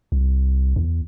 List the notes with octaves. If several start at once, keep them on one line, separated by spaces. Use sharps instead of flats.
C2
E2